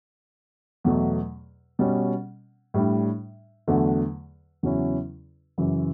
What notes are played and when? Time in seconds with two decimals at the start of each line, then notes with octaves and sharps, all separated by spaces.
0.84 E2 B2 F#3 A3
1.79 B2 G3 C#4
2.74 A2 G3 D4
3.68 E2 D3 F#3 A3
4.63 E2 C#3 F#3 C#4 E4
5.58 F#2 C#3 E3